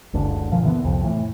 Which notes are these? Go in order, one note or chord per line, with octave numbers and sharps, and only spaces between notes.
F#1 C#2 D3
A#2 F3
D3 E3 B3
C2 F2
A2 E3